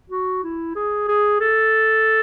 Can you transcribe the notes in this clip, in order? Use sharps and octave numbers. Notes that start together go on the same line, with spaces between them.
F#4
E4
G#4
G#4
A4